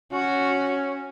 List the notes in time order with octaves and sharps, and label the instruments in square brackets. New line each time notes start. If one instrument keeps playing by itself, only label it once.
[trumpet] C#4 [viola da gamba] F#4